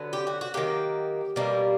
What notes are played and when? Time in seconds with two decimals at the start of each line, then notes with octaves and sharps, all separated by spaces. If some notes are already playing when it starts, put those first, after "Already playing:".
Already playing: D3 F#3 B3
0.13 G4
0.27 F#4
0.41 F#4
0.54 D#3 F#3 A#3 G4
1.36 B2 G3 A#3